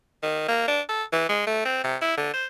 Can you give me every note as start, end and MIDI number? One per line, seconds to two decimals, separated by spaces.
0.23 0.47 51
0.48 0.67 58
0.68 0.81 62
0.89 1.03 69
1.13 1.25 52
1.29 1.43 56
1.47 1.65 57
1.65 1.84 60
1.84 1.97 48
2.02 2.14 64
2.17 2.32 50
2.33 2.46 72